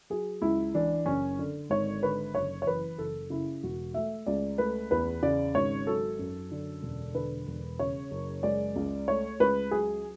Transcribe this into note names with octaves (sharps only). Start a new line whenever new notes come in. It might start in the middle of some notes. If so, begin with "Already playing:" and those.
F#3 G#4
C#2 E4
E3 D4
F#1 C#4
D3
G#1 C#5
D3 B4
F#1 C#5
C#5
E3 B4
F#1 A4
C#3 E4
E1 F#4
A3 E5
C#2 D5
A3 B4
E2 B4
C#3 D5
G#1 C#5
F#3 A4
F#2
D3
E1
D3 B4
E1
C#3 C#5
F#1
G#3 D5
C#2
A3 C#5
C#2 B4
F#3 G#4